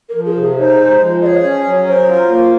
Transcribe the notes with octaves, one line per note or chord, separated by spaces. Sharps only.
A#4
F3
G#4
C3
G#4
D#4 C5 C#5
G#3
F3
G#4 C#5 D#5
C#4
F#3
A#4 C5 C#5
F4
A#3